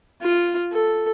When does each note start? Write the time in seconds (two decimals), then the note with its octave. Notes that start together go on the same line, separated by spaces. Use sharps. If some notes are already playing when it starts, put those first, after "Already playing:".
0.21 F4
0.72 A4